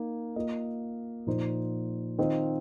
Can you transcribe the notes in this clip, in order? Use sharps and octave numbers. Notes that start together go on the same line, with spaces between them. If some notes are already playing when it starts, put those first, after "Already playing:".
Already playing: A#3 D#4
A#3 F4 D#5
A#2 F3 D#4 C5
D#3 C4 F4 C5 D#5